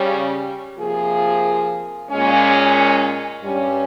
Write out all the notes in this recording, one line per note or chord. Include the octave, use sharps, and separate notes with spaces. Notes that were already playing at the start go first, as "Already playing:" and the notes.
Already playing: C#3 G3 C#4
C3 F3 A#3 F4 G#4
A#2 G#3 C#4
G2 G3 C#4